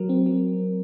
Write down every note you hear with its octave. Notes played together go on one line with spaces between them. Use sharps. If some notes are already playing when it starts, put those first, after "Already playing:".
Already playing: F#3 A#4
C4
F#3